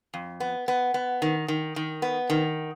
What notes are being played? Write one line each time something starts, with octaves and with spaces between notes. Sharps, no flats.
F2
B3
B3
B3
D#3
D#3
D#3
B3
D#3